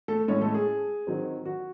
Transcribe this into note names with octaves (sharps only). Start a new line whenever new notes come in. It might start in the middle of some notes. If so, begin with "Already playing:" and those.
A3 A4
A2 G#3 C#4 C#5
A3 A4
G#4
D#3 F#3 C4
F#4